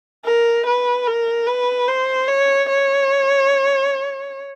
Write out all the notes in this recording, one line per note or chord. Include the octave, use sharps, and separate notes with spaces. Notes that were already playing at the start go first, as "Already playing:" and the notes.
A#4
B4
A#4
B4
C5
C#5
C#5